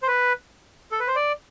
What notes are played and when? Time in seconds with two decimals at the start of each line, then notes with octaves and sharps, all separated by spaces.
0.02 C5
0.07 B4
0.92 A4
1.00 B4
1.08 C5
1.16 D5